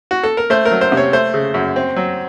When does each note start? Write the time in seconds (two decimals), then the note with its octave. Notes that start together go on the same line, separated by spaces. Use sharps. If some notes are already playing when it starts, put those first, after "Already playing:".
0.11 F#4
0.23 A4
0.37 A#4
0.50 A3 C5
0.65 A#4
0.71 F#3
0.81 C5
0.92 C3
0.97 C#5
1.13 A3 C5
1.34 C#3
1.54 F#2
1.76 C4
1.96 F#3